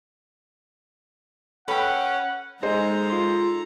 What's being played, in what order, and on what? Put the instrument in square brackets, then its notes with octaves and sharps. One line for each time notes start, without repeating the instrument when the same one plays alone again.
[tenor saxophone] C#4 [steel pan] A4 B5 [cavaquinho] B4 G5 [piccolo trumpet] F#5
[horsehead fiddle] G#3 D#4 [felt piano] G#4 C5 D#5 [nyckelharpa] A4 A#5
[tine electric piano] F4 C6